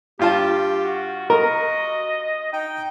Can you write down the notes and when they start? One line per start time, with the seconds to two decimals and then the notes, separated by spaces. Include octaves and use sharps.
0.19 G2 F4 G4 A5
0.84 F#4
1.30 F#4 A#4 D#5
2.53 D#4 G5